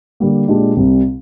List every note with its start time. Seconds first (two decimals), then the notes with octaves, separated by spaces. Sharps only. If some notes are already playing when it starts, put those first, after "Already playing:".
0.20 D3 G3 A#3
0.48 A#2 G#3 D4 G4
0.76 C2 C3 G3